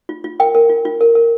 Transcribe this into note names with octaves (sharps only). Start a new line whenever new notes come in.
F4
F4
A#4 G5
A#4
F4
F4
A#4
A#4